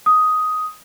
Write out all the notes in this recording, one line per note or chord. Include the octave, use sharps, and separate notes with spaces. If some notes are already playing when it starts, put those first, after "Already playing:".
D#6